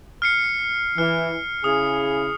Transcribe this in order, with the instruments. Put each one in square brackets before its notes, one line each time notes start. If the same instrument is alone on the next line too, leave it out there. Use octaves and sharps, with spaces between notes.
[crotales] F6 C7 C#7
[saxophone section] E3 [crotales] F6
[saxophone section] C#3 E4 G#4 [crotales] D#6